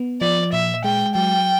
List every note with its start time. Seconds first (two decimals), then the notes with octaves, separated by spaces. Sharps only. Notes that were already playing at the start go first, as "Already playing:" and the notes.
Already playing: B3
0.21 F3 D5
0.52 A#2 E5
0.84 G#3 G5
1.15 F#3 G5